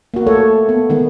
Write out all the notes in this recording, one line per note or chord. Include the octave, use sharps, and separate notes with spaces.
A#3 F#4
A3 A4 C#5
B3
D#3 G#3 B3